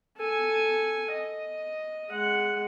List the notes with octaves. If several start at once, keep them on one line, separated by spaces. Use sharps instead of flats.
A4 G#5
D#5
G#3 F#5